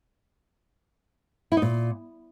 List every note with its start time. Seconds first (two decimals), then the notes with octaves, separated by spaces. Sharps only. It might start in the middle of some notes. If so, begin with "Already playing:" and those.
1.52 E4
1.57 D#4
1.62 A#2